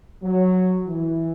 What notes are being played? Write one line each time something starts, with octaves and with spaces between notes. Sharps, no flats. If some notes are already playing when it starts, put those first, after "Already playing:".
F#3
E3